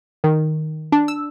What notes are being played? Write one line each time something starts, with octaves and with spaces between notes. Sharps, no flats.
D#3
D4
E6